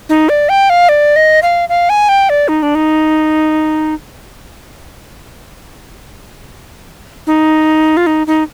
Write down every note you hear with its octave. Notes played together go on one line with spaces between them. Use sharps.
D#4
D5
G5
F5
D5
D#5
F5
F5
G#5
G5
D5
D#4
D4
D#4
D#4
F4
D#4
D#4